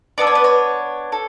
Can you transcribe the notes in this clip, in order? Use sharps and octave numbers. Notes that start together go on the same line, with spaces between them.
B3 D4 A4 D5
C#5
B4
C#5
A4